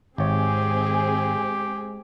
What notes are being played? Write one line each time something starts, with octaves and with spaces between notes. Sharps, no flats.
G#1 G#3 C4 G4 G#4 C#5